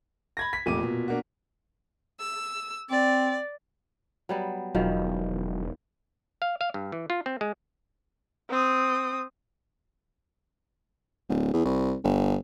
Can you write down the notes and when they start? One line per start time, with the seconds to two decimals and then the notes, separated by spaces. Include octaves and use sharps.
0.37 B5 G#6 A#6
0.53 B6
0.66 F1 F2 A#2 D6 D#7
0.83 B2
1.08 A#3 D4 F#4
2.19 E6
2.90 C4 D5
4.29 F#3 G3 B3
4.75 E1 B2 D#3 F3 F#3
6.42 F5
6.61 F5
6.74 G2
6.92 E3
7.10 F4
7.26 C4
7.41 G#3
8.50 C4 D#6
11.29 D1
11.53 E2
11.65 C2
12.04 G1